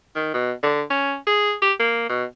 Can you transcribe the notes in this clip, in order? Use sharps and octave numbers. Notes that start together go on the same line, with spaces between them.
D#3
B2
D3
C#4
G#4
G4
A#3
B2